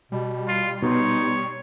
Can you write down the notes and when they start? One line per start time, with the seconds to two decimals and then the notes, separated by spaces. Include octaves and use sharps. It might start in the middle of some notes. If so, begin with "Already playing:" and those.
0.12 B2 G3
0.48 F4
0.83 B2 B3 D#4 C#5 C6